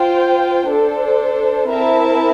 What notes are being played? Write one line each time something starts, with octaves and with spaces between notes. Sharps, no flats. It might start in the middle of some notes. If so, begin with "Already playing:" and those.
Already playing: F4 C5 G5
D4 A4 C5
C4 E4 A#4 E5 A5